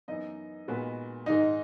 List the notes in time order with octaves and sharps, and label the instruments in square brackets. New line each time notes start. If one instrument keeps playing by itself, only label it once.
[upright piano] F#2 E3 B3 [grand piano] D#4 D#5
[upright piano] A#2 G#3 B3 F#4 B4
[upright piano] G#1 G#2 D#3 G#3 [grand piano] D#4 D#5